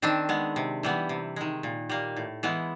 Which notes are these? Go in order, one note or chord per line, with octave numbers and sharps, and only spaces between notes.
D#3 C4 D4
G#3 B3
C3
E3 G3 B3
C3
D#3 G#3
A#2
G3 A#3
A2
E3 G#3 B3